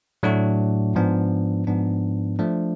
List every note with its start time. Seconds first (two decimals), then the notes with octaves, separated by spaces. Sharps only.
0.23 A2 F#3 A3 D4 F#4
0.95 G#2 F3 B3 D4
1.67 G#2 F3 B3 D4
2.39 F3 A3 D4